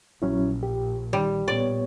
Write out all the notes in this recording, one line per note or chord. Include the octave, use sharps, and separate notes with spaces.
A#1 F#3 C#4 E4
G4
D#3 G3
A#2 B3 C#5 D5